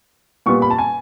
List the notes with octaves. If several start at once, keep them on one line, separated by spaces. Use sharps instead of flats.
A#2 G3 B3 C#6
B5
A5
G#5